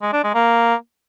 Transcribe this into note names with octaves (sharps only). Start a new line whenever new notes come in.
G#3
D4
G#3
A#3